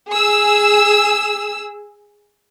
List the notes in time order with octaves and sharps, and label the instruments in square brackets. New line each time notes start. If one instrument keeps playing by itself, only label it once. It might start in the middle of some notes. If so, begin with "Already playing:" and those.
[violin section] G#4 E6